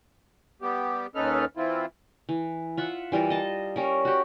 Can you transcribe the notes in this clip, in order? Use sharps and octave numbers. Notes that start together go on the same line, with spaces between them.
G3 B3 G4
D#2 C#4 D#4 A4 B4 F6
E3 C4 E4 F4
E3
F4 E5 F#5
E3 G3 F4 A#4
D#5 A5
G3 C#4 A#4
F#4 G4